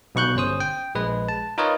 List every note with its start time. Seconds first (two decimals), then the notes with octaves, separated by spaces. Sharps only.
0.15 B1 B2 C#6 F#6 G6
0.35 G1 C#4 C5 D#6
0.60 G5
0.95 A#1 G#3 B4
1.29 A5
1.58 D#4 F4 A#4 B4 C#5 D#5